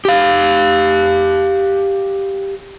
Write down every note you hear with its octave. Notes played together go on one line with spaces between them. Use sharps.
G4 F5